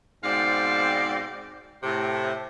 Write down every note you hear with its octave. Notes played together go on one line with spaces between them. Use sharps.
G#2 B2 C4 C5 D5 F5
A2 C3